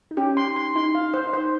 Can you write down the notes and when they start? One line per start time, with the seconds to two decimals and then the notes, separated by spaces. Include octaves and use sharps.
0.11 D#4
0.17 C#4 G4
0.37 C6
0.56 C6
0.76 D#4 C6
0.95 F5
1.01 D#4
1.14 C5
1.27 D#4
1.33 C5